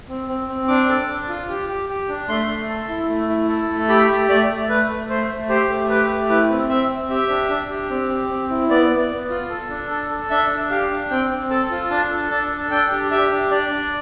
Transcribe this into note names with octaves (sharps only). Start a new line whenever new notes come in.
C4
C4
C4
D4 D6
A4
D4
F4
G4
G4
G4
D4
A3 C6
A3
A4
E4
A3
E4
A4
A3
G4 B5
A3
A3 D5
A3
A3 B4
A3
A3 C5
A3
G4 C5
A3
G4 B4
A3
E4 B4
C4
C4 E5
C4
G4 E5
D4
D4
G4
C4
G4
C4
E4
B3 D5
B3
B3
F4
A4
D4
A4
A4
D4 E5
D4
G4 F5
D4
C4 G5
C4
A4 A5
F4
D4 A5
A4
D4 A5
A4
D4 G5
G4
G4 E5
D4
D4 D5
D4